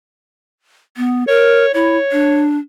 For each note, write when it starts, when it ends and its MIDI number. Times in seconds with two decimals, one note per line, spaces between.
0.97 1.24 59
1.28 1.66 70
1.28 1.73 73
1.74 1.98 64
1.74 2.44 73
2.12 2.58 62